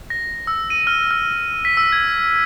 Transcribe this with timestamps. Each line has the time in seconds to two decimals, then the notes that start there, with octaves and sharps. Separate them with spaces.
0.10 A#6
0.47 E6
0.70 D#7
0.87 F6
1.11 F6
1.65 B6
1.77 E6
1.92 G#6